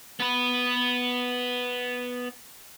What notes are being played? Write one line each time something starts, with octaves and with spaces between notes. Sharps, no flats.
B3 B4